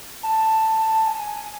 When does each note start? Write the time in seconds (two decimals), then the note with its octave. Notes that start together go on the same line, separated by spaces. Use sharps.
0.23 A5
1.07 G#5